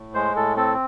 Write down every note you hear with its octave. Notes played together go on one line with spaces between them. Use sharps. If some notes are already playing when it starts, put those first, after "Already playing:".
Already playing: A2
G#3 C5
A2 A4
C4 A4